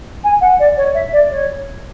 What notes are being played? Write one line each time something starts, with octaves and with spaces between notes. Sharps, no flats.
G#5
F#5
D5
C#5
E5
D5
C#5